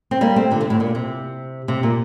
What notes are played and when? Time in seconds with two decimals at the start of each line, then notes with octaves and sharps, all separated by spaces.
0.11 C4
0.21 G3 A#3
0.36 A3 C4
0.51 A#2 D3
0.61 C3
0.70 A2
0.80 A#2
0.95 C3
1.68 C3
1.83 A#2